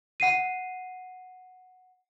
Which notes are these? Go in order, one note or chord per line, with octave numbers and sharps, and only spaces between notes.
F#5 C7 D#7